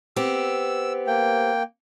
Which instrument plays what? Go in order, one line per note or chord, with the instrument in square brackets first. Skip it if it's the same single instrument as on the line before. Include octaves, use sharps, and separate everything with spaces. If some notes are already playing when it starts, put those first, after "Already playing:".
[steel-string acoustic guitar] B3 C4 G4 [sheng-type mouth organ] E6
[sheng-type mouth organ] A#3 G5